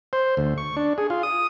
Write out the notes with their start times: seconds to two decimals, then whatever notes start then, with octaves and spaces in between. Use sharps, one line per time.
0.13 C5
0.37 D2
0.58 C#6
0.77 D4
0.98 G#4
1.10 F4
1.23 D#6